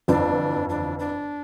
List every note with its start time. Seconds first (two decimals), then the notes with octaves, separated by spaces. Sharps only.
0.08 G1 F2 E3 D4
0.69 D4
0.99 D4